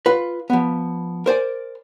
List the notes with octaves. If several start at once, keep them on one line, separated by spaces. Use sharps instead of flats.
F4 B4
F3 B3
A#4 C5 D5 G#5